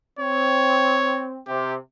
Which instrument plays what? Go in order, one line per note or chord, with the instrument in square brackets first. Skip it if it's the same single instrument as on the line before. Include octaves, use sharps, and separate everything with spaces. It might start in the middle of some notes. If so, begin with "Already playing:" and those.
[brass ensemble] C4 [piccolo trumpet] C#5
[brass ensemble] C3 [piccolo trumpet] G4